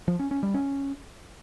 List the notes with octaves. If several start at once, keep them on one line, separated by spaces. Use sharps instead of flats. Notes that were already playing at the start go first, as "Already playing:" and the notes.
F3
C#4
C#4
G3
C#4